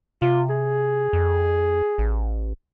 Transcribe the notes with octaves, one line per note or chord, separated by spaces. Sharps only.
C3 F4
G#4
F2
A1